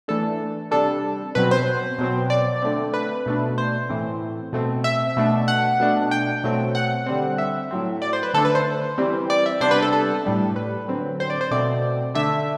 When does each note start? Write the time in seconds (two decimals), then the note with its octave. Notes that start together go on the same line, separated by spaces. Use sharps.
0.08 E3 A3 D4 A4
0.71 C3 G3 D4 A4
1.35 B2 F#3 C4 B4
1.51 C5
1.99 B2 F#3 C4
2.30 D5
2.62 D3 A3 C4
2.94 B4
3.26 B2 A3 D4
3.58 C5
3.89 A2 E3 A3 C4
4.53 B2 A3 C4
4.84 E5
5.17 B2 A3 D4
5.48 F#5
5.80 B2 A3 D4
6.11 G5
6.44 B2 F#3 A3 C4
6.75 F#5
7.06 D3 G3 C4
7.38 E5
7.71 A2 F#3 C4
8.02 D5
8.13 C5
8.23 B4
8.34 D3 A3 D4 A4
8.45 B4
8.55 C5
8.98 E3 G3 C4
9.30 D5
9.46 E5
9.61 C3 G3 B3 D4 C5
9.71 B4
9.82 A4
9.93 A4
10.25 A2 G3 D4
10.56 B4
10.88 D3 F#3 C4
11.20 C5
11.30 D5
11.41 C5
11.51 B2 A3 C4 D5
12.15 D3 A3 D4 E5